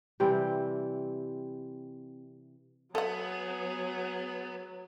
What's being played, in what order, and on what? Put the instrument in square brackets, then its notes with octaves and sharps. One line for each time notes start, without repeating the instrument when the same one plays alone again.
[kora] C3 E3 G3 C4
[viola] F#3 [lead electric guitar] B3 [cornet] G#4 [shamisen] A4 F#5